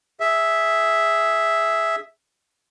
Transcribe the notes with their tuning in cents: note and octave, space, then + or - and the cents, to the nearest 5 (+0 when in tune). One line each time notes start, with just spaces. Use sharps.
G#4 +0 E5 +0